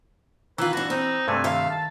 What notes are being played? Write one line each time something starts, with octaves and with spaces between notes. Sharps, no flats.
D#3 E3 F4 B4
G2 D4 F#4
C4 D#4
G2 C3 A3 G#5
D#3 E5 F5
A5